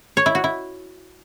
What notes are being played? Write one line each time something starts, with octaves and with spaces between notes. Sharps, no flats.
C#5
E4
F#4
E4